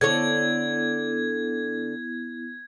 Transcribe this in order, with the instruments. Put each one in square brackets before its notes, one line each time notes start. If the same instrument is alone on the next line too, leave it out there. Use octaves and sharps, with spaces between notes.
[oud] D3 A4 C#5 [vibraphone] B3 E4 [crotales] G#6